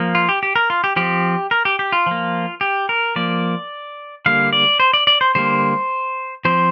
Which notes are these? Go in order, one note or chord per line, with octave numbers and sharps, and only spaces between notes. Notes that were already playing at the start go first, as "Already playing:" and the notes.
Already playing: F3 A#3
F4
G4
G4
A#4
F4
G4
F3 C4 G4
A#4
G4
G4
F4
F3 A#3
G4
A#4
F3 A#3 D5
D3 G3 A#3 F5
D5
C5
D5
D5
C5
D3 G3 A#3 C5
F3 C4 C5